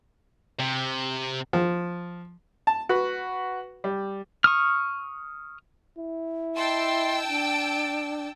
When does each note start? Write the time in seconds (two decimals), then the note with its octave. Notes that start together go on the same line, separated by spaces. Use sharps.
0.60 C3
1.53 F3
2.67 A5
2.89 F#4 B4
3.84 G3
4.44 C#6 D#6 F6
5.98 E4
6.57 D#5 G5 A5 C6 E6
7.28 D4 D7